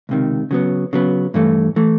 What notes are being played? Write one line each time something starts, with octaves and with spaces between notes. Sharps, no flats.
C#2 C3 D#3
C#3 F#3 B3
C#3 F#3 B3
G2 E3 A3
E3 A3